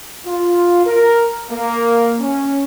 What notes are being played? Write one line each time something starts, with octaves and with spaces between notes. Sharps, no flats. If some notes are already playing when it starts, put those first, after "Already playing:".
F4
A#4
A#3
C#4